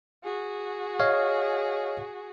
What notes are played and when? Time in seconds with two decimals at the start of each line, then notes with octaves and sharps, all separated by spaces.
0.24 F#4 G#4
1.00 C#5 D#5 F5